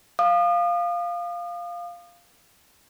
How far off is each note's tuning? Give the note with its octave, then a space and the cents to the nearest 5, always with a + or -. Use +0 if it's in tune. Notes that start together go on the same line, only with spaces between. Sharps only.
F5 +0 D#6 -40